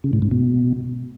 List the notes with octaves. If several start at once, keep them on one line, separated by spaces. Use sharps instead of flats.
C#3
A2
G#2
B2